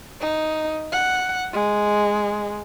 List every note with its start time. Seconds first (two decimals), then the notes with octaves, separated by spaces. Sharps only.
0.21 D#4
0.92 F#5
1.53 G#3